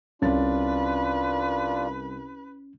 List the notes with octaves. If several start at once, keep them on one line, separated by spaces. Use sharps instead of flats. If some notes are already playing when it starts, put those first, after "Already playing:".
C2 C#4 D4 F4 B4 A6